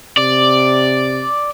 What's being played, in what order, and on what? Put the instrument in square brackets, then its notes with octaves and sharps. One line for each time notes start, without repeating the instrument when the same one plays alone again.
[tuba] C3 [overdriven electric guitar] D5